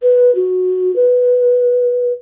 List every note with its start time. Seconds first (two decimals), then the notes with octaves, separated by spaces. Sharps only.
0.02 B4
0.35 F#4
0.96 B4